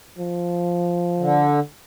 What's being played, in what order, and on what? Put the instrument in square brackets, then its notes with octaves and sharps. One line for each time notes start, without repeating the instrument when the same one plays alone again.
[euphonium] F3
[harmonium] D3